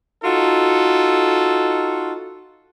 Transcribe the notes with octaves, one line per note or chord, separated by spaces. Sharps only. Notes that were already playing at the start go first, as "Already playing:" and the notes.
D#4 F4 F#4 A4